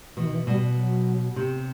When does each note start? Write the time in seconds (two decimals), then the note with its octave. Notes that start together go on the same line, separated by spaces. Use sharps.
0.17 B2 E3
0.25 D#3
0.33 E3
0.47 B2 G3
0.77 F#3
1.36 C3